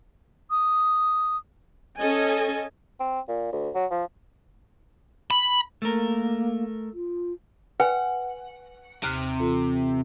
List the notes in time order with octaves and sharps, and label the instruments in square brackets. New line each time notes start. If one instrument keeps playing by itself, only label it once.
[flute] D#6
[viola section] C#4 A4 D#5 G#5
[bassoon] C4
A#2
D2
F#3
F3
[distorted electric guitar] B5
[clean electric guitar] A3 A#4 [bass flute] A#3
[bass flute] F4
[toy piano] B4 G#5 [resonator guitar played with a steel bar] F#5
[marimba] D#2 F6 F#6 [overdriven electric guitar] C3
[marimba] E3 F4 A4